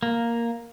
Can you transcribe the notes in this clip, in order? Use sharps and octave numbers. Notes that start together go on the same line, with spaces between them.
A#3